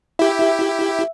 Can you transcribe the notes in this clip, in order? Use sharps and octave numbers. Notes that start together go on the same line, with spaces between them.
E4 G4 E5